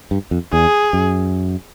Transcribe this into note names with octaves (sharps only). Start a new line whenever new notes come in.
G2
F2
E2 G#4
F#2